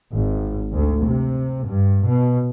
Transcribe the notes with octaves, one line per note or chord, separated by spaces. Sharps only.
G#1
D2
C3
G2
B2